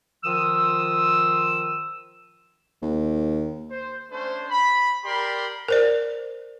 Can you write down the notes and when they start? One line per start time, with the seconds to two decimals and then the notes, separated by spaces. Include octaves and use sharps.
0.24 D#3 F3 F4 D#6 E6
2.82 D#2
3.69 C5
4.11 A3 C#4 D4 C5
4.50 B5
5.03 G4 A#4 D5 B5 C6
5.68 A#4 C5 D5